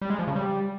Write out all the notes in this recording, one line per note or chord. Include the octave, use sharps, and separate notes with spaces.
G3
G#3
F3
C#3
G3